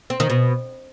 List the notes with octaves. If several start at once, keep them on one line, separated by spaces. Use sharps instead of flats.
C4
D#3
B2